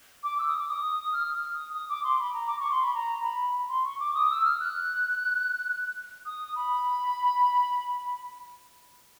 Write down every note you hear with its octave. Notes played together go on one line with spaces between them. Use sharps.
D6
E6
D#6
D6
D#6
F6
D#6
D#6
D6
C6
B5
A#5
D6
C#6
C6
B5
A#5
B5
C6
C#6
D6
D#6
E6
F6
F#6
D#6
B5